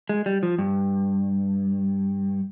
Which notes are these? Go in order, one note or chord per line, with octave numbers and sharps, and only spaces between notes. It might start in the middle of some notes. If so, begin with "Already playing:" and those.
G#3
G3
F3
G2